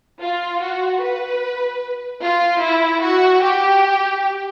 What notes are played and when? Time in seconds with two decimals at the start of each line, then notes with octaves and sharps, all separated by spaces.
0.21 F4
0.61 F#4
1.02 B4
2.22 F4
2.62 E4
3.02 F#4
3.43 G4